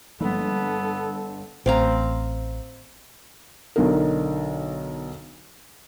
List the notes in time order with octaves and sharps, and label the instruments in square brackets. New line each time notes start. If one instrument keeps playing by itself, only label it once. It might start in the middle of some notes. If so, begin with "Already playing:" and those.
[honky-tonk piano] G1 [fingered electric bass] F3 G#3 A#3 [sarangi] B3 [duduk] A4
[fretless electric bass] A1 [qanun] C4 F5 A#5
[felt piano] B1 D3 D#4 A#4